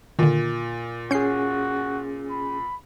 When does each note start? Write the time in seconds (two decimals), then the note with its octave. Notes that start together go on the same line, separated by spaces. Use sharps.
0.19 A#2 D3 D#3
1.11 C#4 F#4 G#4 G6 C7
2.30 B5